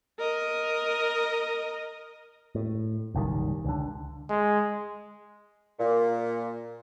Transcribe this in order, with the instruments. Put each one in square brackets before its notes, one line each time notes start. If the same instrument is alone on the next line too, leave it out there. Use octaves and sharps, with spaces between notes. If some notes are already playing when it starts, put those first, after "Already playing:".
[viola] A#4 D#5
[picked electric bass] A2
F#1 B1 D#3 G3
C#2 D3
[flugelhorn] G#3
[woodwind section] A#2